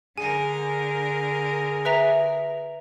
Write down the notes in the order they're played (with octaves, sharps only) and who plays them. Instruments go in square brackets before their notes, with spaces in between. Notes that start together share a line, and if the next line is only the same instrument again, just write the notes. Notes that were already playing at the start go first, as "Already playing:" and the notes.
[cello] D3 A#4 [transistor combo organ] G#4 [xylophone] G#5
[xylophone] B4 E5 A#5